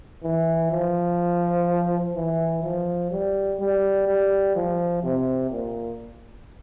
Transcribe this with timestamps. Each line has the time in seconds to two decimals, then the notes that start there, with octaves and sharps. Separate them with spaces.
0.23 E3
0.71 F3
2.15 E3
2.63 F3
3.11 G3
3.59 G3
4.07 G3
4.55 F3
5.03 C3
5.50 A#2